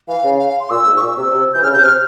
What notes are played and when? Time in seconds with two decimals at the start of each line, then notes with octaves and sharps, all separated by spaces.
0.08 E3 F5
0.24 C#3
0.39 F5
0.49 F5
0.60 C6
0.70 A#2 E6
0.86 G#2
0.97 C#6
1.01 A#2 E6
1.17 C3
1.32 C3
1.53 E3 G6
1.62 C#3 F6
1.73 C3 G6
1.84 C3 F6